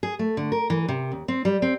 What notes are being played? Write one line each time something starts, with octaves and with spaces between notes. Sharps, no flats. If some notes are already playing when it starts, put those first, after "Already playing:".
G#4
A3
D3
A#4
E3
C3
D#2
C4
G3
C4